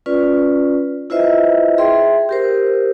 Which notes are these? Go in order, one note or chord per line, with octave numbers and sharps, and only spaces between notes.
C#4 F4 B4 D5
E4 F4 B4 C5 D#5 E5
G#4 E5 G5 C6
G4 A#4 C5